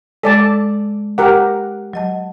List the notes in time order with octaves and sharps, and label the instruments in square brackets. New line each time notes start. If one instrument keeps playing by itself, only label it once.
[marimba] G#3 [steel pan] A4 D5 A5
[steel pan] G4 A#4 F#5 [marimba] D6
[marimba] F#3 D#5 A5